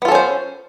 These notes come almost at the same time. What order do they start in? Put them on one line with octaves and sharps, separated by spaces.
B3 F4 A4 C#4 C5